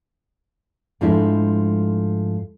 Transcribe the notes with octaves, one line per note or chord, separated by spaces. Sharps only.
G#2 F3 G#3 A3 D4 E4